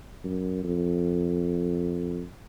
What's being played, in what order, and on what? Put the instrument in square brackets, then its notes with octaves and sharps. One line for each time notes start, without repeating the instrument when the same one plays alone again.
[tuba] F#2
F2